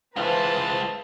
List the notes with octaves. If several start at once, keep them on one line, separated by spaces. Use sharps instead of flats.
E3 G#3 F4 B4 C5 A5